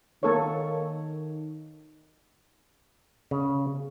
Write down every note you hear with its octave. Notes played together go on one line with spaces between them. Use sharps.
D#3 A#3 A4 C#5
C#3